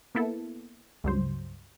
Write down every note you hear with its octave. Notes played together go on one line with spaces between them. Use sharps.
A#3 B3 E4 A4
C#2 G2 F#3 C5